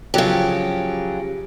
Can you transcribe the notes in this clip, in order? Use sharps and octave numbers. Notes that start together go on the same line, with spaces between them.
C#3 F3 F#3 G4